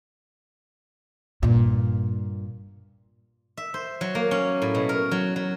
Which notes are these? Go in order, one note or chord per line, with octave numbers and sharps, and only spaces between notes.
G2 A#2
E5
C5
F#3
A#3
C#4
A2
B2
A#4
F#3
F#3